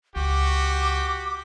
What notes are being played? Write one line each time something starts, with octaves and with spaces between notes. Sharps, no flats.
C#2 F#4 G4 D6